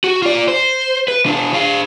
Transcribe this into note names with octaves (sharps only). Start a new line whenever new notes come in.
F#4
F4 D5
C5
B4
B2 D4
D4 F5